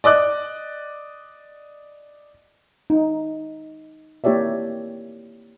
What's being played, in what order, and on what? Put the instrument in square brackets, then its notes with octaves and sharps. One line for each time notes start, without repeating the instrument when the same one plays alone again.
[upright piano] D5 D#5 D6 F#6
[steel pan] D#4
A#3 E4 G4 C#5 D5 E5